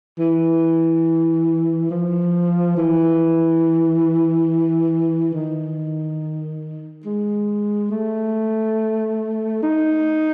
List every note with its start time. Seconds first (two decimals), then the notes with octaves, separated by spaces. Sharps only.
0.19 E3
1.91 F3
2.76 E3
5.34 D#3
7.05 G#3
7.91 A3
9.63 D#4